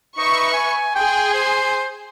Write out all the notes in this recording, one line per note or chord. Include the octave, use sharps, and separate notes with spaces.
D#4 B4 E5 C#6
G#5
G#4 G5 G#5 C6
C5